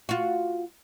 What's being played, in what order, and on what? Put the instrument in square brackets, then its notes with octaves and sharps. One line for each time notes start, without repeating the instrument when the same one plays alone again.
[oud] F4 F#4